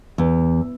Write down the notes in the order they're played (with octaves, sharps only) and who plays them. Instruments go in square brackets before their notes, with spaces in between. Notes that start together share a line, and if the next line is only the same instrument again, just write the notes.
[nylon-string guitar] E2